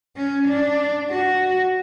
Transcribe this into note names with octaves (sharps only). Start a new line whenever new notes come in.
C#4
D4
F#4